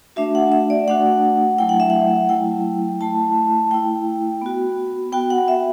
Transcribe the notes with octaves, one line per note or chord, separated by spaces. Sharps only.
A3 D4 F#4 E5
F#5
E5
D5
A3 D4 F#4 F#5
F#3 A3 E4 G5
F#5
E5
F#5
F#3 A3 E4 G5
A3 E4 A5
A3 E4 G5
B3 F#4
B3 F#4 G5
F#5
E5